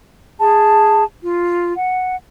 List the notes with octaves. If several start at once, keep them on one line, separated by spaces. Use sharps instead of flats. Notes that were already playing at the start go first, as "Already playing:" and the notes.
G#4 A5
F4
F#5